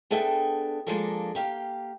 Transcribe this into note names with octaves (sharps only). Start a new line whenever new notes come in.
B3 D4 G#4 A4 E5 G5
F3 G#3 A#3 D4 A4 A#4
A#3 G4 F5